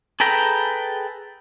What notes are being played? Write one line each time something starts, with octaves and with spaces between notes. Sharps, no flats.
G#4 A4 B4 G5 A#5